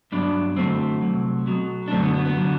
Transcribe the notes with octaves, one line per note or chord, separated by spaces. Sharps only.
G2 F#3 B3 D4
F#2 D3 F#3 A3 C4
C2 B2 F#3
B1 B2 F#3
D4
F#2 D3 F#3 A3 C4
B3
B3
B3
D3 F#3